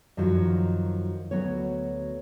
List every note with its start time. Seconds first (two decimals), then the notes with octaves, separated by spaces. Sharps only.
0.17 F#2 D#3 F3 F#3
1.31 D2 F#3 B3 C#5